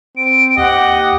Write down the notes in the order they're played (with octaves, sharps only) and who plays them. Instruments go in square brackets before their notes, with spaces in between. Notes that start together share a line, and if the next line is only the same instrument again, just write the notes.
[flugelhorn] C4 [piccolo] D7
[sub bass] D#2 [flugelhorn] G4 [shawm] D#5 [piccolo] F#5